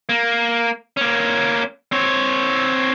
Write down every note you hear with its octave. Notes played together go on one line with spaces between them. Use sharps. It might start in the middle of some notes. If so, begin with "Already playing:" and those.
A#3
A#3 C#4
C4 C#5